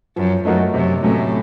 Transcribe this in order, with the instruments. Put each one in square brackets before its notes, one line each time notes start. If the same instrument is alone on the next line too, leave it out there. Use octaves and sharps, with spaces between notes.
[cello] F#2 [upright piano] F3
[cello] F#2 [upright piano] A3 D#4 F#4 A#4
[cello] F#2 [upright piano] C3
[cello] A2 [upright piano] F#3 A3 C#4